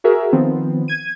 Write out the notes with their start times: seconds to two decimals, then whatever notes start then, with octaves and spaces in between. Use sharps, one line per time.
0.04 F#4 G#4 A#4 E5
0.32 D#3 F3 B3 C4
0.88 G#6 D#7